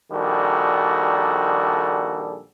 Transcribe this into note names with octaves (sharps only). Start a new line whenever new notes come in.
A#1 D#3 G3 F#4 G#4 A4